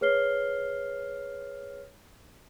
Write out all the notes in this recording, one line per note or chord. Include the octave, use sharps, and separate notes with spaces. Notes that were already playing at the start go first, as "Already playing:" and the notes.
G#4 B4 C#5 F6 C7 G7